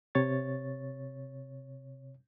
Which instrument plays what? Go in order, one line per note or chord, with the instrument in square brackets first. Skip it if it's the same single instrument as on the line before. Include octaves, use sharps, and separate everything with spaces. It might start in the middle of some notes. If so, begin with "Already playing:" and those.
[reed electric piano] C3 C#5 A6